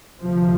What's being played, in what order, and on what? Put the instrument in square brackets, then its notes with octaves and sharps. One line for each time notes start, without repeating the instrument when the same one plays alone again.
[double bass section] D2 C3 F3